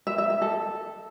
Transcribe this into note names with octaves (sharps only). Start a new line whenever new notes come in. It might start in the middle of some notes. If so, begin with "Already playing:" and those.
E5
E5
E5
A4